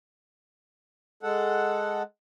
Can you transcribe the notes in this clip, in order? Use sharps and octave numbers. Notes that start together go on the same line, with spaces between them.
G#3 A4 F#5